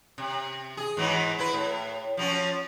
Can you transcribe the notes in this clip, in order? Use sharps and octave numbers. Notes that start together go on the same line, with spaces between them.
C3
G#4
G#2 E3 F#3
E4 B4
A2
F3 F#3 C#4